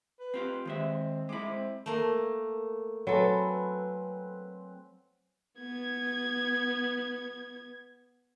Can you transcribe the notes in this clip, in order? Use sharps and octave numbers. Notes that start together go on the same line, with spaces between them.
B4
C4 F4 G4
D#3 G#3 C4 E5
G#3 E4 D6
C4
A3 A#3
F#3 C4 A4 B4 G#5
B3 G#6